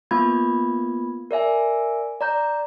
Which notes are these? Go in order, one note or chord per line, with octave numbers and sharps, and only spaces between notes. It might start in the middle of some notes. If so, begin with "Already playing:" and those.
A#3 B3 F4 B5 G#6
A#4 D5 E5 G#5
D5 A#5 G6